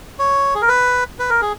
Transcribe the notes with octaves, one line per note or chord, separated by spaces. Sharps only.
C#5
G#4
A#4
B4
B4
A#4
G#4